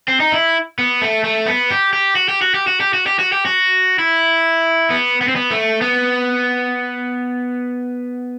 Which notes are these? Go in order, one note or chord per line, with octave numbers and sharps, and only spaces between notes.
C4
D#4
E4
B3
A3
A3
B3
G4
G4
F#4
G4
F#4
G4
F#4
G4
F#4
G4
F#4
G4
F#4
E4
B3
B3
C4
B3
A3
B3